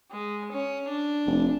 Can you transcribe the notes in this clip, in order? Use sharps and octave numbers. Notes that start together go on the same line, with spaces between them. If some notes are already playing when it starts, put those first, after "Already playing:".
G#3
C#4
D4
F1